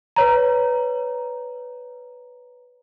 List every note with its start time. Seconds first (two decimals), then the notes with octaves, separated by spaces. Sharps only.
0.16 B4 C#5 A#5